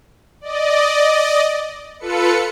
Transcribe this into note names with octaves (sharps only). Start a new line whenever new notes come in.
D5 D#5
F4 A4 B4 C#7